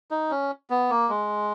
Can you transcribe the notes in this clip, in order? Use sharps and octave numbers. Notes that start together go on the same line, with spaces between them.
D#4
C#4
B3
A#3
G#3